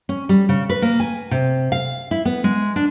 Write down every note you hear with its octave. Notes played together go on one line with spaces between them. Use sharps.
C#4
G3
C#3
B4
A#3
G#5
C3
F5
E4
B3
G#3
D4